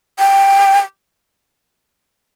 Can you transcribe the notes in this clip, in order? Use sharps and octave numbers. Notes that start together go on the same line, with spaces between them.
G5